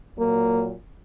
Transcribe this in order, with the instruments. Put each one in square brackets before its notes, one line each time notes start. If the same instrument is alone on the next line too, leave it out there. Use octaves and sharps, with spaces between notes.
[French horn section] A#2 F#3 A#3